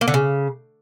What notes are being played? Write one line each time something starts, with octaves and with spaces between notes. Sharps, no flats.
A#3
D3
C#3